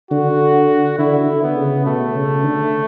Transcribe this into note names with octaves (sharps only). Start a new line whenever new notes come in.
D3 F#4
D3 E4
D3
B3
C#3
B2 A3
C#3
D3